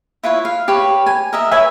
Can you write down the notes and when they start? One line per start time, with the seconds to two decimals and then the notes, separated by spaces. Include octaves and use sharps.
0.23 E4 F4 B4 C#5
0.45 F5
0.68 G4 B4 C#5
1.06 G#5
1.33 A#4 D#5 E5
1.51 B4 C#5 E5 G#5